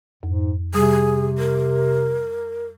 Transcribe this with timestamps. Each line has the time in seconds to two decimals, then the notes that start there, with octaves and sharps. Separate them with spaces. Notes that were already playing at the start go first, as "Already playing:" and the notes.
0.23 F2 G#2
0.74 C3 G3 G#4 D#6
1.38 A#4